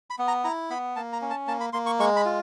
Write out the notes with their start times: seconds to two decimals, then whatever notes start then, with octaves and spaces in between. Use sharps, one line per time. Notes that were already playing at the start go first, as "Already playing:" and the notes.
0.10 B5
0.19 B3
0.28 A#5
0.44 E4 A#5
0.70 B3 B5
0.96 A#3 A5
1.13 A#5
1.22 C#4
1.30 A5
1.47 A#3 A5
1.60 B5
1.73 A#3 C6
1.86 C#6
1.99 G#3 C#6
2.16 B5
2.25 F4